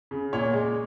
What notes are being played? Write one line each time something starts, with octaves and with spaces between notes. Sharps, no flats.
C#3
A#2 C#5
G#3